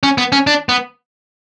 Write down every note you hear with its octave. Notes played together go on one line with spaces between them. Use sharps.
C#4
B3
C#4
D4
B3